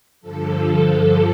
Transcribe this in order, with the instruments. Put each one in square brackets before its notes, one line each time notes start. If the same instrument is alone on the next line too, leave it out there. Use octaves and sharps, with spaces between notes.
[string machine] G2 D3 F3 A4